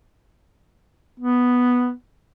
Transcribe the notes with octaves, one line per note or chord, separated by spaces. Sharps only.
B3